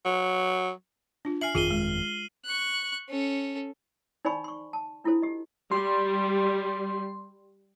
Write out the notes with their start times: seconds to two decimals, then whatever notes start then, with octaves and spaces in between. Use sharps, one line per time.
0.05 F#3
1.25 D4 F4
1.41 E5 G#5 F6 C7 F#7
1.55 G1 F2 D#3 F4 G#4 C7 D#7 G7
1.71 G#3
2.45 C#6 F#6
3.09 C#4 A4
4.25 D#4 C5 D5 G#5 B5 C#6
4.44 C6 C#6
4.73 A5
5.04 D4 E4 F4 A4 C5
5.22 G4 D#5
5.71 G3 C6